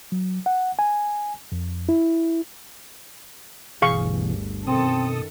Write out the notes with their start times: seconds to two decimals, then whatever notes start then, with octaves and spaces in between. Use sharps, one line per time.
0.12 F#3
0.46 F#5
0.79 G#5
1.52 F2
1.89 E4
3.82 G1 D2 B2 E3 G#4 F5 C#6
4.67 F#2 B2 D#3 C4 A4 D#6